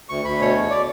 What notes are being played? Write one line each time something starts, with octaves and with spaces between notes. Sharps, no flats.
D2 C#6
D2 B5
B2 C#5
E2
D5